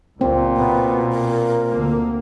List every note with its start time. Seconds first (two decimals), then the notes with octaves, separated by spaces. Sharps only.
0.21 C#2 A#2 F#3 C4
0.56 B2 B3
1.11 A#4
1.71 D2 D3 A#3